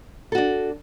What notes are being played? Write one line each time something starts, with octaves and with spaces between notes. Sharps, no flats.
D4 F#4 A4